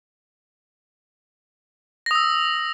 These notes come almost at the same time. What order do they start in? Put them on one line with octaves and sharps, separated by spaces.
A#6 D#6 E6